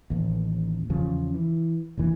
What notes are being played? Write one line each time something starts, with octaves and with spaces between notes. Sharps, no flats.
A1 D#2
E2 C#3 F3 C#4
E3
F1 D#2 E3 A#3